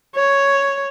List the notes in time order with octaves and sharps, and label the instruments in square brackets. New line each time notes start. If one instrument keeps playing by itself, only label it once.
[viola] C#5